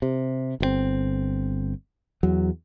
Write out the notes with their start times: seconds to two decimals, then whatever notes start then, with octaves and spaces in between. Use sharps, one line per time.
0.02 C3
0.60 G1 A#2 C4
2.23 E2 F#3